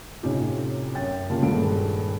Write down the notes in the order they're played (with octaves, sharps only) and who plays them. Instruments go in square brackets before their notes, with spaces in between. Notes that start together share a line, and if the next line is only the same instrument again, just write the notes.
[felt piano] A2 C3 C#4 D#4 F4 G4
F#2 C#5 G5 A6
C2 C#3 A#3 F4 A5
D#1 G2 G#3 A4 D7